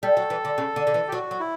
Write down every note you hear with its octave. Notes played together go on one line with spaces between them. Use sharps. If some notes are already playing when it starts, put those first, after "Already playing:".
G3 A4
F#3
E3
D3
C#3
D3
D3
E3
G4
F#3 F#4
F#3
E4